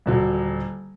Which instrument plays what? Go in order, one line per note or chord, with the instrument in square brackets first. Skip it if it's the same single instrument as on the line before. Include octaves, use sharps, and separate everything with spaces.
[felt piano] D#1 D3 F#3